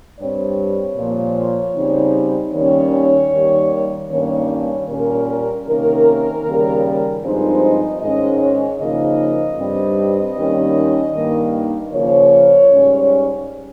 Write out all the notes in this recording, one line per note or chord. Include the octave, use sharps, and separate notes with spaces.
G2 G3 C4 C#5
A#2 F3 A#3
C#3 G3 C4 D#4
D#2 D#3 G3 C#4 C#5
D#2 D#3 G3
G2 D#3 A#3 C#4 C#5
C#5
A#2 G3 C#4 A#4
C3 D#3 A#3 C#4 A#4
D#2 C#3 G3
G2 F3 G#3 C4 D#4 C5
D#5
G#2 D#3 G#3 C#4 D#5
C#5
C#3 F3 A#3 D#4 D#5
G2 G3 C4
D#2 D#3 G3 C#4
G2 D#3 A#3
C#3 F3 A#3 C#5
G#2 G3 C#4